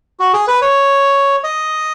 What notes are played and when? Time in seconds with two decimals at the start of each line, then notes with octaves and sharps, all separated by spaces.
0.20 F#4
0.33 G#4
0.47 B4
0.62 C#5
1.44 D#5